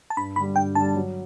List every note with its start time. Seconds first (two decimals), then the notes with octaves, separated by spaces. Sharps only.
0.10 A5
0.17 G2 B5
0.36 D3 B5
0.41 G3
0.56 G2 G5
0.75 D3 A5
0.80 G3
0.95 F#3